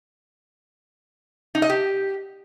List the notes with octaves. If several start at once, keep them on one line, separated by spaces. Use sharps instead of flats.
D#4
D#5
G4